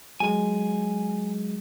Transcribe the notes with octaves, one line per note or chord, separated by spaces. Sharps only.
F#3 G#3 G#5